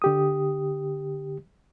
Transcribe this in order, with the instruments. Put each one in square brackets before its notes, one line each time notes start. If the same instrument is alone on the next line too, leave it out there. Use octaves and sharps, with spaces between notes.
[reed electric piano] D3 G4 D#6